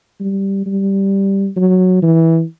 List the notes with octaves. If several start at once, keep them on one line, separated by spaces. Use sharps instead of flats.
G3
G3
F#3
E3